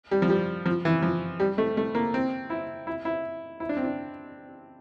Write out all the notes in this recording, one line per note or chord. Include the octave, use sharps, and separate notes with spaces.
G3
F3
G3
F3
E3
F3
G3
A3
A3
A#3
C4
E4
E4
E4
E4
D4
C4
D4